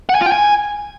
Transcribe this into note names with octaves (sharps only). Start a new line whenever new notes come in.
F#5
G#5
F4
G5
G#5